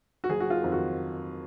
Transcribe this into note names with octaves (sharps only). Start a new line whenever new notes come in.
F#4
F#1 G#4
F#4
F4
F2 D#3
F#4